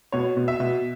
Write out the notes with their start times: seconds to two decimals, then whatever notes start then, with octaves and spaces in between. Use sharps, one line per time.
0.12 B2 C#5
0.37 B2
0.48 E5
0.60 B2